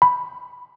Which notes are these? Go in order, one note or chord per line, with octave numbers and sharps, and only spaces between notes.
B5